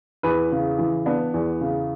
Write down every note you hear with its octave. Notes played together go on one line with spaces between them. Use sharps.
E2 B4
C#3
E3
B3 D4
E2
C#3